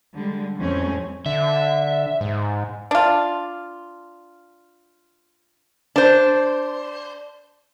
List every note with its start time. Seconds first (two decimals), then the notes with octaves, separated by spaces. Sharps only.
0.14 D3 G3 G#3
0.59 F2 A2 G3 G#3 C4 C#4
1.26 D3 E5
2.21 G#2
2.91 D4 F4
5.96 D4 C5